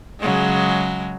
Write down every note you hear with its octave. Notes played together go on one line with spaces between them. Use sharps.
C#3 F#3 G#3